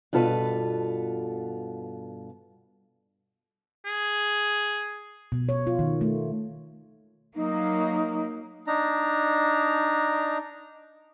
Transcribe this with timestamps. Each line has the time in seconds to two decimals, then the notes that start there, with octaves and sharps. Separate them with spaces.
0.13 G2 B2 F4 A4 B4
3.85 G#4
5.32 B2
5.49 C#5
5.67 F4
5.79 D#3
6.01 A3
7.35 F#3 A#3 D#4
8.67 D4 D#4 A#5